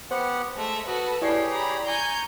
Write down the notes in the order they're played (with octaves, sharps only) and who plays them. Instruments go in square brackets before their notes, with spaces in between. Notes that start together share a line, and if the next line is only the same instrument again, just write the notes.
[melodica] B3 G4 F#5 [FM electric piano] C5 C#7
[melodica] G#3 [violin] A3 E5
[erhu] F#4 [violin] A4 B4 [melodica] D#6
[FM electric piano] E4 D5 C7 [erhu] G4 [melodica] G#4 C#5
[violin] A#5 B5
[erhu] G#5 [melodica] A#5 C#6 [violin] G6